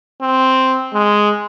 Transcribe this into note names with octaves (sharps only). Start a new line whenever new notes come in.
C4
G#3